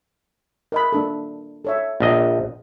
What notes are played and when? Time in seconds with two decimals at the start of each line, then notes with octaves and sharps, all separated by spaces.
0.72 A#4 D#5 B5
0.93 A#3 D4 A4
1.65 A4 C#5 E5
2.00 A#1 D#5 F5